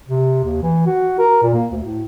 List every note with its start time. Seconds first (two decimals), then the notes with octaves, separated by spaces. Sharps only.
0.08 C3
0.44 D#2
0.62 E3
0.87 F#4
1.19 A#4
1.43 A#2
1.54 A#3
1.72 D2
1.83 A2